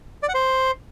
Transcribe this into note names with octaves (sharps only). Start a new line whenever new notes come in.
D5
F#5
C5